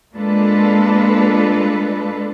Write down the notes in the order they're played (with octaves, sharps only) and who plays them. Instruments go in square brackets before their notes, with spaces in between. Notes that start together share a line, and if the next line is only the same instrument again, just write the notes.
[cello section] G#3 A#3 D4 F4 A4 B4